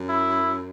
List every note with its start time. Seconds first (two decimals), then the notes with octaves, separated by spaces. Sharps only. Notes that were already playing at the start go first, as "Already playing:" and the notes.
Already playing: F#2
0.09 E4